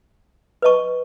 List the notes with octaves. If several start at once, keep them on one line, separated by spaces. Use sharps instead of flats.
B4 D#5 A5 C#6